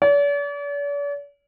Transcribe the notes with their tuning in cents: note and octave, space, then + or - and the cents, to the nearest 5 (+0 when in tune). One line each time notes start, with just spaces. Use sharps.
D5 -45